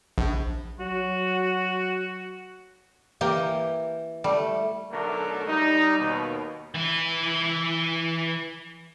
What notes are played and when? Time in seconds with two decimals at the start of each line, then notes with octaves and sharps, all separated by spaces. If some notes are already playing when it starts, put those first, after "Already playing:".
0.18 A#1
0.80 F#3 F#4
3.21 E3 A#3 G4 G5
4.24 G3 A3
4.90 B1 D3 F#3 A3 A#4
5.47 G3 D#4
5.98 D#2 B2
6.75 E3 E4